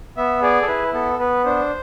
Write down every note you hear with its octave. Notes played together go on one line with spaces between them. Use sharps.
B3 E5
G#4 D5
A4
E4 B4
B3 A4
B3 B4
D4 C5